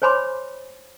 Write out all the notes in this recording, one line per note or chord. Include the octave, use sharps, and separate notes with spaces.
C5 C#5 G#5 B5 C6 D6